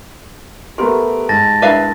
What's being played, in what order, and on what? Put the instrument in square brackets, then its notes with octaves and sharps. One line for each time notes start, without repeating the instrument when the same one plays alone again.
[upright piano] A3 B3 A#4 [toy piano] G4 C6
[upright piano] G#2 [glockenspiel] A5 A6 A#6
[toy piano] D4 E4 A#4 [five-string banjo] B4 E5 F5